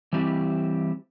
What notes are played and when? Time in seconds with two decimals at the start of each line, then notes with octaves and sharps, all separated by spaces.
0.13 E3 G3 C4 E4 G4